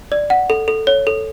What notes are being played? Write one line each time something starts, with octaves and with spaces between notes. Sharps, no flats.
D5
F#5
A4
A4
C#5
A4